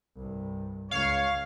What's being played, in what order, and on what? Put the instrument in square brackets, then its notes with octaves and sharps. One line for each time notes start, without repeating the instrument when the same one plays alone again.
[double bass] C2 G2
[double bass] C#2 [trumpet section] C#5 [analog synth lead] F5